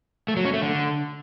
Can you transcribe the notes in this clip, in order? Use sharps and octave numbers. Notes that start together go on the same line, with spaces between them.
A3
F#3
C#4
A3
D3